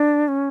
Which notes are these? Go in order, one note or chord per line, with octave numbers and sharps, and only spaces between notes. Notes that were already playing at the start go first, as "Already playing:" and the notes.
Already playing: D4
C#4